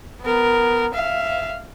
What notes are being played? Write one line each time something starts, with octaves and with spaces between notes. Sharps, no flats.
B3 A#4
E5 F5